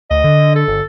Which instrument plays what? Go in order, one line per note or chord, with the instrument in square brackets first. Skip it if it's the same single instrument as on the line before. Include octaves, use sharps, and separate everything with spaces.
[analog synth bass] D2 [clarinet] D#5
[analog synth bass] D3
[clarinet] A4
[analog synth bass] G1